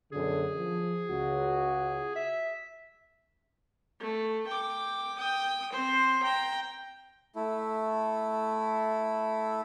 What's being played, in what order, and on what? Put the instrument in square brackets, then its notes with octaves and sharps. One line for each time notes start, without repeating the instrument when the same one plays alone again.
[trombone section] F#2 B2 D3 [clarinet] G#4
[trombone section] F3
C#2 F#4
[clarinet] E5
[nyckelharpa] A3
G5 D6
G5 D#6
C4 C5
G5 A#5
[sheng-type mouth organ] A3 E4